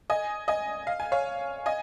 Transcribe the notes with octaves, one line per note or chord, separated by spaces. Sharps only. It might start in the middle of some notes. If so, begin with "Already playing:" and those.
D#5 G#5
D#5 G#5
F5
G#5
C#5 F5
D#5 G#5